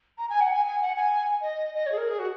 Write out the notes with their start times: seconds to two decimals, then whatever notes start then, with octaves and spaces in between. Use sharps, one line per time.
0.18 A#5
0.30 G#5
0.41 F#5
0.52 G#5
0.66 G#5
0.82 F#5
0.97 G#5
1.41 D#5
1.75 D#5
1.86 C#5
1.92 G#4
1.97 A#4
2.09 G#4
2.19 F#4